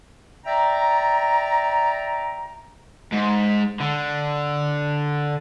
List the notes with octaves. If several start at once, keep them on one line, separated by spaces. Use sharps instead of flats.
D5 E5 G5 A#5
G#2
D3